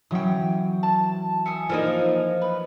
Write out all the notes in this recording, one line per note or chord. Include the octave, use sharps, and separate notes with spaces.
E3 F#3 C#4 G5 D#6
A5
E5 G#5 D#6 C#7
F3 A#3 D#4 E4 D5 D#5
B4